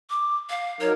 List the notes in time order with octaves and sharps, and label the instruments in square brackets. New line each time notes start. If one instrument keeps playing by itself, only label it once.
[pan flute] D6
F5
[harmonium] F#3 D#4 A#4 [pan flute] C#5